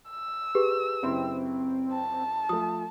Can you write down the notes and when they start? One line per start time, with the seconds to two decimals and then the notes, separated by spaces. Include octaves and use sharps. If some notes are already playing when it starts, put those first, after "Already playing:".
0.10 E6
0.55 G4 G#4 B4
1.03 F#1 C4 E4 C6
1.93 A5
2.49 F3 A3 D#6